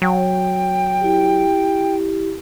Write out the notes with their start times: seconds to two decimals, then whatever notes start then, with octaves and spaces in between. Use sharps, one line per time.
0.02 F#3 G5
1.01 E4 G4